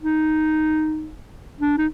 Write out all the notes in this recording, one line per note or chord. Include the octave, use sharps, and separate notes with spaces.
D#4
D4
D#4